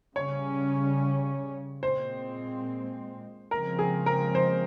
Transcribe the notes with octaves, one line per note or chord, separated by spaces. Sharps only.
C#3 G3 C#4 C#5
A#2 G#3 C4 C5
C#3 F3 G#3 C4 A#4
G#4
A#4
C5